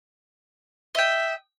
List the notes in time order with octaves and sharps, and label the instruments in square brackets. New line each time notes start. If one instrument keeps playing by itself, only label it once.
[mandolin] D#5 G5 [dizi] E5